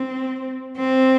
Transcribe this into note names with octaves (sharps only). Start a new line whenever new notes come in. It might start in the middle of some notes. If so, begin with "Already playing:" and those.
Already playing: C4
C4